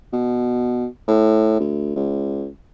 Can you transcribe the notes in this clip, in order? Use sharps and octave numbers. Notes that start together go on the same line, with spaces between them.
B2
A2
D2
C#2